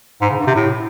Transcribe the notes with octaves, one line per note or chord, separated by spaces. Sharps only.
G#2
C#3
G2
C3
A2